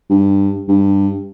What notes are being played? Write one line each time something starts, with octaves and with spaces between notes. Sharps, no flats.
G2
G2